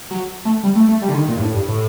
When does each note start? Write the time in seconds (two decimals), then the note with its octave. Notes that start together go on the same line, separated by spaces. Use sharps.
0.11 F#3
0.45 A3
0.63 G3
0.75 A3
0.89 A3
1.02 G3
1.09 D3
1.15 D#3
1.28 A#2
1.37 G2
1.41 A2
1.54 G2
1.68 A2